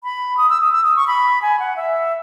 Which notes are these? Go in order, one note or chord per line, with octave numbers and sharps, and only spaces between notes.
B5
D#6
E6
D#6
E6
D#6
C#6
B5
G#5
F#5
E5